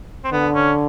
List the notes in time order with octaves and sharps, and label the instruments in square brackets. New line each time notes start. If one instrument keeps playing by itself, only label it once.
[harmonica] C4
[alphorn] D3 [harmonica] B3
[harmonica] C#4